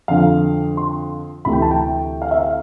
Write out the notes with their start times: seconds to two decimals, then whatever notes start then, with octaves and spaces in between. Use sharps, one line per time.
0.08 F2 D3 F3 F5
0.77 C6
1.45 D2 C3 E3 A3 B5
1.53 G5
1.62 A5
1.71 G5
2.22 F5
2.31 E5
2.39 F5